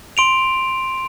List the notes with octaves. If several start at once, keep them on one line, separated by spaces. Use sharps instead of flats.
C6 D7 F7